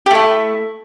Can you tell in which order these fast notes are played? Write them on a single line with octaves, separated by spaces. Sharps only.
G4 A3 E4